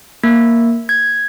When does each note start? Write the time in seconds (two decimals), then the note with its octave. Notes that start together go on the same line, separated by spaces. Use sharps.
0.24 A#3
0.89 G#6